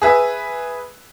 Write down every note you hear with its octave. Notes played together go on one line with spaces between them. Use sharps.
G#4 B4 E5